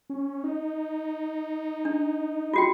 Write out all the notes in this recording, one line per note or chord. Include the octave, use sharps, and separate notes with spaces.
C#4
D#4
D4
F4 F#4 G5